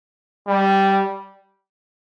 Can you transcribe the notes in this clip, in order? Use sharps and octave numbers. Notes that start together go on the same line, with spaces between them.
G3